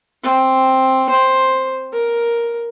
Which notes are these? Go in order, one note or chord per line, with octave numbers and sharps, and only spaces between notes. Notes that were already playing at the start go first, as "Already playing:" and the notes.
C4
C5
A#4